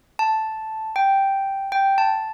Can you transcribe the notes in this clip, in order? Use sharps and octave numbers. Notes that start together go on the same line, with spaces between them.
A5
G5
G5
A5